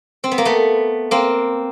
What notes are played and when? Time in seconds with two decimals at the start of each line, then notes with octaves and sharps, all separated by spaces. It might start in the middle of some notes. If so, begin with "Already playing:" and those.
0.24 C4
0.31 B3
0.38 A#3
0.45 A3 B3
1.11 A#3 C4